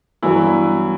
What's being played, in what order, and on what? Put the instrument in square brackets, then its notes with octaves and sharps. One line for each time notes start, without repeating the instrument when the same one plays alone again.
[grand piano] G2 E3 F#3 B3 E4